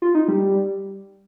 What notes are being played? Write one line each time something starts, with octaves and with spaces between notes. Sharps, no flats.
F4
D#4
G3